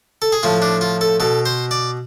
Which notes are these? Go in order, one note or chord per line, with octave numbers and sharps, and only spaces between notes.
A4
G#4
A2 F3 F4
D4
F4
A4
B2 A4
C5
D5